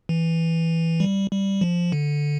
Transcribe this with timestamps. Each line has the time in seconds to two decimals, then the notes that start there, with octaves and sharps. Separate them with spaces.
0.09 E3
1.00 G3
1.31 G3
1.61 F3
1.92 D3